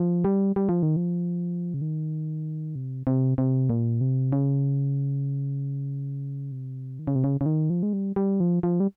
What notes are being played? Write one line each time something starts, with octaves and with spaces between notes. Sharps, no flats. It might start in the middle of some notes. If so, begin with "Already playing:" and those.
Already playing: F3
G3
G3
F3
D#3
F3
C#3
D#3
C3
C3
C3
A#2
C3
C#3
C3
D#3
C#3
C3
C#3
C#3
D#3
F3
G#3
G3
G3
F3
F3
G3